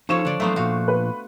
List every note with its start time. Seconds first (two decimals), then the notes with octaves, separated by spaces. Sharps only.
0.09 F3 D#4 F4 A4 C#5 C#6 E7
0.25 D3 D4 D5
0.40 F#3 A3 B3 C5 F5 A#5
0.56 A#2 F3 F#4 F5
0.88 B4